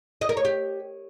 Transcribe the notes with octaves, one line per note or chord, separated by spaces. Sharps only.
D#5
A#4
C#5
G4